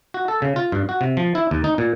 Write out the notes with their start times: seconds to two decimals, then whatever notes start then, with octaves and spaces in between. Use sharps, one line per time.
0.14 F#4
0.28 A4
0.42 C#3
0.56 F4
0.72 G2
0.89 F#4
1.01 C3
1.17 F3
1.35 E4
1.51 D#2
1.64 D#4
1.78 A#2